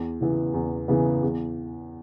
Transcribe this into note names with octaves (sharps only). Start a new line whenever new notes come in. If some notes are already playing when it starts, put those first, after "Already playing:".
Already playing: E2
C#3 E3 B3 E4
E2
C#3 E3 B3 E4
E2